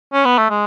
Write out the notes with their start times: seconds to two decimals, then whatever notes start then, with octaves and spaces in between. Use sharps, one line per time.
0.13 C#4
0.25 B3
0.38 A3
0.50 G#3